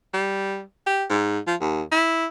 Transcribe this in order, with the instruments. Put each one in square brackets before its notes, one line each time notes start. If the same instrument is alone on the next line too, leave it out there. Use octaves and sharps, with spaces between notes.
[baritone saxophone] G3
G4
G#2
F3
D#2
E4